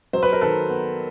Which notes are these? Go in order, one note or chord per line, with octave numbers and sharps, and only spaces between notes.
F#3 C5
B4
A#4
D#3 A4 B4
B3